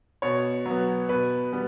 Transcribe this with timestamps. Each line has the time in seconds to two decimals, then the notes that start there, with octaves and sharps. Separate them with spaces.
0.22 B2 C#5
0.66 F#3 B3
1.09 B2 B4
1.53 G3 B3